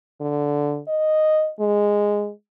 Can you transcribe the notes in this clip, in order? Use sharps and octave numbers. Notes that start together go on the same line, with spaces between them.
D3
D#5
G#3